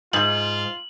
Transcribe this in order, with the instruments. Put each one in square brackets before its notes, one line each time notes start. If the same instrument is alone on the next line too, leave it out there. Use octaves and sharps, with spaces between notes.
[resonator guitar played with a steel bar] G#2 [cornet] F4 [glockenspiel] F#7